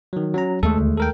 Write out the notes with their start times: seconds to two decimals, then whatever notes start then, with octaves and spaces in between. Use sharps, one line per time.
0.13 D#3 F#3
0.34 F#3 C#4 A#5
0.63 D#2 G#3 A3 A4
0.78 D2
0.98 A4 A#4 G5